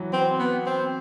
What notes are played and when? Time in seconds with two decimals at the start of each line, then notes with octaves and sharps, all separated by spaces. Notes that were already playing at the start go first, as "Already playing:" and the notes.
Already playing: E3 F#3
0.13 C4
0.39 B3
0.66 C4